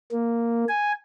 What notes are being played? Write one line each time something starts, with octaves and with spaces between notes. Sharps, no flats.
A#3
G#5